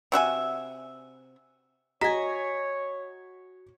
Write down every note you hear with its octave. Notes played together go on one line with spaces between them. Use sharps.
C3 F#4 E5 G#5
F#4 C#5 D#5 G#5 A#5 B6